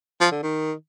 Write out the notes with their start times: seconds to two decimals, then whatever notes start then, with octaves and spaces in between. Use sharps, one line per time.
0.21 F3
0.32 D3
0.43 D#3